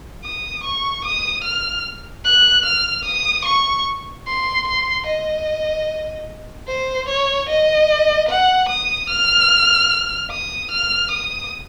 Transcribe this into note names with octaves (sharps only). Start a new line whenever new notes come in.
D#6
C#6
D#6
F6
F#6
F6
D#6
C#6
C6
C6
D#5
C5
C#5
D#5
F#5
D#6
F6
D#6
F6
D#6